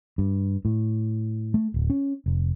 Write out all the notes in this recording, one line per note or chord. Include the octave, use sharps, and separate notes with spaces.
G2
A2
A3
D1
C#4
F1